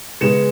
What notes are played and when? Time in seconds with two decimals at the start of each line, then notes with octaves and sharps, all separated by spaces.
0.21 C#3 G#3 B3 C#7 E7